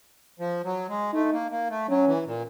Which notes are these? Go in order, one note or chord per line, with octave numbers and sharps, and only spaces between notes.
F3
F#3
G#3
A3 D#4
A#3
A#3
A3
F#3 C#4
E3
A#2